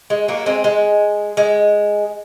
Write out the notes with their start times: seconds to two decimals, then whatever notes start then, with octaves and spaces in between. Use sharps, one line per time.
0.10 G#3
0.28 F#3 A#3
0.46 G#3 C4
0.64 G#3
1.37 G#3